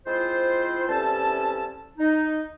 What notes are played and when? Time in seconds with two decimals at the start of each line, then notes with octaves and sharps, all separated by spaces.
0.06 G#3 C4 E4 F4 C5
0.89 E2 C3 G3 C#4 A4 A5
1.98 D#4